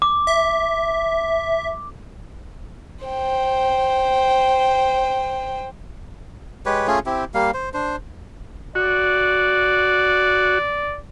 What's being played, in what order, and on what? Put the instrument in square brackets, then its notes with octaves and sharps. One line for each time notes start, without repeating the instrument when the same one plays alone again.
[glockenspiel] D6
[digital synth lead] E5
[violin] C5 G5
[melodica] G#3 G4 B4 C#5
A3 C#4 F4 G#4
C4 E4 G4
G3 A#3 F5
C5
D4 C5
[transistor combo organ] F#4 [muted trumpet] D5